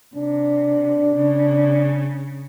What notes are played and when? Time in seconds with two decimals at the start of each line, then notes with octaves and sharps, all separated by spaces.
0.16 C3 D4
1.14 C#3